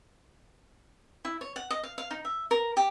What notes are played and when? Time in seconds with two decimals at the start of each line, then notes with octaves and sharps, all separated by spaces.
1.25 E4
1.41 C#5
1.56 F#5
1.71 D#5
1.83 F5
1.98 F5
2.11 D#4
2.25 E5
2.51 A#4
2.77 G4